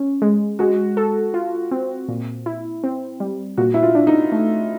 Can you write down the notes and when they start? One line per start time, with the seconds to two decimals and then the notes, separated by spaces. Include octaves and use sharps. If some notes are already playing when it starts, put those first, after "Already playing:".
Already playing: C#4
0.22 G#3
0.59 G#3 F#4
0.97 A4
1.34 F4
1.71 C4
2.08 A#2
2.46 E4
2.84 C4
3.20 G3
3.58 A#2 F#4
3.74 E4
3.83 F4
3.95 D4
4.07 D#4
4.32 A3